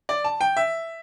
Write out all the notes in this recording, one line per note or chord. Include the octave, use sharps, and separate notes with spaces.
D5
A5
G5
E5